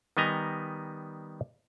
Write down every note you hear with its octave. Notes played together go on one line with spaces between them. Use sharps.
D#3 G3 B3 D#5 G#5 A#5